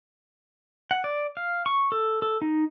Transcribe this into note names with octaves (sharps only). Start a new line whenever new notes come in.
F#5
D5
F5
C#6
A4
A4
D#4